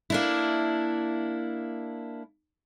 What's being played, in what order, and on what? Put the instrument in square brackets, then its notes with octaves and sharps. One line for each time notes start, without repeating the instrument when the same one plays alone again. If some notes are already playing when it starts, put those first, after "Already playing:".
[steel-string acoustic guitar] A#3 D4 E4